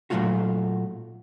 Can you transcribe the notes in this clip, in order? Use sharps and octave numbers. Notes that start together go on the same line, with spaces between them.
A#2 E3 F#3 A3 F4 F#4